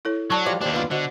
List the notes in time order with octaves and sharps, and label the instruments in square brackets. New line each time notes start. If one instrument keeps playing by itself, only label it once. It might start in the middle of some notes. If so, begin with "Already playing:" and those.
[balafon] E4 A4 C#5
[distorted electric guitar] F#3 [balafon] D5 A5 C#6
[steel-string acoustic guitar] F3 G3 F4 [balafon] D6
[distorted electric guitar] D#2 D4 [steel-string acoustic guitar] G3 C5
[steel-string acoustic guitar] B3 F4
[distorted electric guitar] D3 [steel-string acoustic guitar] F#4 [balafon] C5 D#5